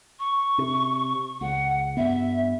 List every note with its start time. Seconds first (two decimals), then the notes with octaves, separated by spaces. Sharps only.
0.19 C#6
0.58 C3
1.41 C#2 F#5
1.97 G2 B3 E5